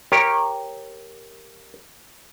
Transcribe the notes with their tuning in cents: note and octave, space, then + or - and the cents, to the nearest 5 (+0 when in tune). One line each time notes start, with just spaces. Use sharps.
G4 +0 A#4 +0 C#5 -20